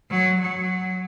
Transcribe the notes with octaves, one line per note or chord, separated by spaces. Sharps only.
F#3
F#3